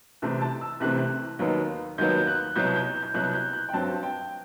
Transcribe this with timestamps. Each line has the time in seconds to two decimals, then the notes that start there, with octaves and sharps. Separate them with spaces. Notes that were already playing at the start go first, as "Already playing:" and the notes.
0.22 C2 C3 E3 A3 C4
0.41 A5
0.61 E6
0.80 C2 C3 E3 A3 C4 F#6
1.39 D#2 D#3 F#3 B3
1.98 D#2 D#3 F#3 B3 G6
2.27 F#6
2.56 C2 B2 F#3 G6
2.76 G6
3.03 G6
3.14 C2 B2 F#3 F#6
3.33 G6
3.53 F#6
3.69 G5
3.73 G2 F#3 C4 A5
4.03 G5